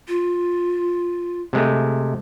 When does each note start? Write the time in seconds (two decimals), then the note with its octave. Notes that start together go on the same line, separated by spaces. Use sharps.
0.08 F4
1.53 C3 G#3 A3